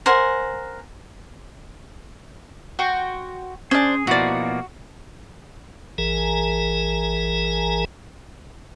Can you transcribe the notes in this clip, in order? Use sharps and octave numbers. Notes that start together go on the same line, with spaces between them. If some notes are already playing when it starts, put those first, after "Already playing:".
A#4 C5 F#5 G#5
F#4 G5 C6
C#4 D4 G#4 C5
B2 F3 A#3 E4 F#4 D5
A1 E3 G#4 A#4 G#5 A#5